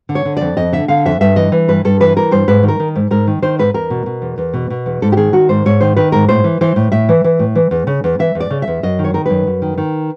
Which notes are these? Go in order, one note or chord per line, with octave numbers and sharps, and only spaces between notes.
D3
C#5
D3
F2 D5
F2 D#5
D3 E5
D3 F5
F2 E5
G2 E5
E3 D#5
E3
G2 B4
G2 A4
E3 B4
E3 A#4
G2 C5
G#2 B4
D#3
A#4
D#3
G#2
G#2 A#4
D#3
D#3 C5
G#2 B4
E2 A#4
B2
B2
E2
E2
B2
B2
E2
G#2 A4
G4
D#3 G#4
D#3 F#4
G#2 C5
G#2 C#5
D#3 C5
D#3 B4
G#2 A#4
A2 C5
E3
E3 C5
A2
A2 E5
E3
E3
A2
E3
E2
C#3
E2
E3 E5
E2
D5
C#3
E5
E2
F#2 D#5
D#3
C#5
D#3 A#4
F#2 B4
F#2
D#3
D#3